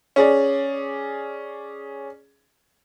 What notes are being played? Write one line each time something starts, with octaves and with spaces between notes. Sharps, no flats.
C#4 G#4 D5